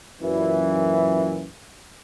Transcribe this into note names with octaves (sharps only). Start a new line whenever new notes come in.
F#2 A#2 E3